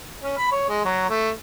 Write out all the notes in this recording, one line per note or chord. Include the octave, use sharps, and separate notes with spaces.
C#4
B5
C#5
G#3
F#3
A3